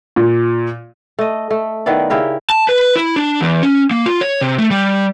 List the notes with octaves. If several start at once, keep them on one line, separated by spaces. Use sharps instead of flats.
A#2
A3 D#5
A3
D#3 B3 E4 D5
C#3 E4 G4 A#4
A5
B4
E4
D4
E2
C#4
A#3
F4
C#5
C3
A3
G3